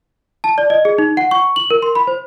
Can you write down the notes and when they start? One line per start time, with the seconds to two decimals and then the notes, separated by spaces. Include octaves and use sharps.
0.44 A5
0.58 D5
0.70 D#5
0.85 G#4
0.98 D#4
1.17 F#5
1.31 C#6
1.56 F#7
1.70 A#4
1.82 C6
1.95 B5
2.07 C5